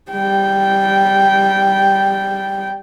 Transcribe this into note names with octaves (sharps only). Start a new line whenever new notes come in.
G3 G5